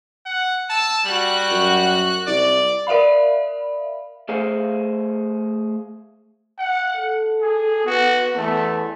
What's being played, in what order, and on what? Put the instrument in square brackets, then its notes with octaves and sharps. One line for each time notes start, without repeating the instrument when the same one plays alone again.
[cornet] F#5
[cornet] A5 [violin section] E6
[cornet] G3 [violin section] F#4 F#6
[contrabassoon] F#2
[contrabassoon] C2 [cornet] D5
[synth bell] A#4 D5 E5 F5 B5
[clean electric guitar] A3 G#4 C5 F5
[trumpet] F#5
[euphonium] A4
[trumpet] G#4
[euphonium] B3 [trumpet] F#4
[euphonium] E2 [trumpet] A3